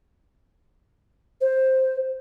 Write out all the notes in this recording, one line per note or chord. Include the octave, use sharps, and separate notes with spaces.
C5